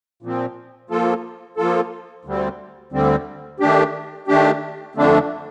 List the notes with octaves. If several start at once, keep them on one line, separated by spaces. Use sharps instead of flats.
A#2 F3 C4
F3 A#3 F4 A4
F3 A#3 F4 A4
D2 D3 G3 C4
D2 D3 G3 C4
D#3 A3 D4 G4
D#3 A3 D4 G4
F2 D3 A3 D4